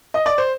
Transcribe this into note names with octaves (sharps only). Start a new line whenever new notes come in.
D#5
D5
C5